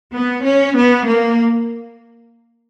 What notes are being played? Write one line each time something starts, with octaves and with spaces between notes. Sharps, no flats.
B3
C#4
B3
A#3